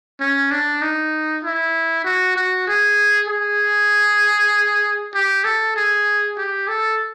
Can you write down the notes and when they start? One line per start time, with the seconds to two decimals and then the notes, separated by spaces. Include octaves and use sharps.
0.20 C#4
0.51 D4
0.82 D#4
1.44 E4
2.05 F#4
2.36 F#4
2.68 G#4
3.28 G#4
5.14 G4
5.44 A4
5.76 G#4
6.38 G4
6.68 A4